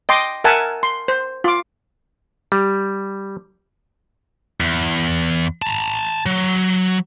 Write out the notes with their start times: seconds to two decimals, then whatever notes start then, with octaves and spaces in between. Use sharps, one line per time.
0.09 D#5 G5 C6 D6
0.44 A#4 E5 F#5 G#5 A5
0.83 C6
1.08 C5
1.44 F4 D6
2.52 G3
4.60 E2
5.62 A5 A#5
6.26 F#3